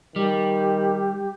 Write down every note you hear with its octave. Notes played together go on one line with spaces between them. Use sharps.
D#3 G3 G4